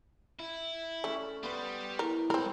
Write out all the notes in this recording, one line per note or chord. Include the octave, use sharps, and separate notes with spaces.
E4
A3 C#4 D5
G3 B3 A5 C6
E4 A#4
G#3 C4 A#4 B5